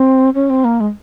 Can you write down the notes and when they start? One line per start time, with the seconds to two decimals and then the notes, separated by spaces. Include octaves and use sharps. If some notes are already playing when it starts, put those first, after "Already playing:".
Already playing: C4
0.34 C#4
0.50 C4
0.64 A#3
0.80 G#3